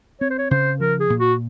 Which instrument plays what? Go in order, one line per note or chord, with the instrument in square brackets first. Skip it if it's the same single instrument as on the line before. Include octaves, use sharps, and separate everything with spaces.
[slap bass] C4 [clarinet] C#5
[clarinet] C5
C#5
[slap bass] C#3 [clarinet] C5
[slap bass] F3 [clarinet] A#4
[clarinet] G#4
[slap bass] A#2
[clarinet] F#4